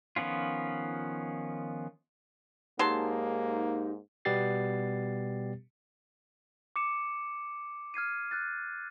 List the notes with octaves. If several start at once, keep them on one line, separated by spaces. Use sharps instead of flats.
D#3 F3 B3 C#4 F4
G#2 F#3 A#3 D#4 G4 G#4 A5 C6
B2 G3 B3 G4 A6 C7
D6 C#7 E7
F6 G#6 C7 D#7
F6 F#6 A6